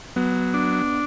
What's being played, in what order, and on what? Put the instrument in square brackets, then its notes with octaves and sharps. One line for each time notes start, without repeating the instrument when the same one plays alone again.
[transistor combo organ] F#3 [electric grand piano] B3
[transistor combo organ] D4